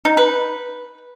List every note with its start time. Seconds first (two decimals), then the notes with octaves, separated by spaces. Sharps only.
0.05 D#4
0.17 B4